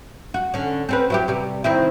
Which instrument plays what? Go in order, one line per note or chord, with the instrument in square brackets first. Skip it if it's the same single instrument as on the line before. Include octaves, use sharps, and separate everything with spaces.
[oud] F#4
D3 C#4
C4 C#4 B4
F#3 E4 G4
C3 G3
D#3 C4 E4